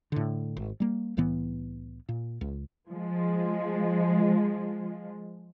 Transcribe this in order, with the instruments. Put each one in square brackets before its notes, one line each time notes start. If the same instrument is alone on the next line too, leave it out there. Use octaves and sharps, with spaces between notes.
[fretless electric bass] A2 D3
G#1
G3 A#3
C2 A2 E3 B3
A#2
C#2
[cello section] F3 G#3